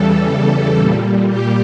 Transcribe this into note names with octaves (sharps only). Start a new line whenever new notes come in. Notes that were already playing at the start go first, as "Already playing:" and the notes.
Already playing: E2 C#3 E3 G3 A4
A#2 G3
G4